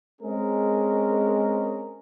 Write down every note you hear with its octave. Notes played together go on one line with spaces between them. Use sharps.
G#3 C4 C#4 G#4 A#4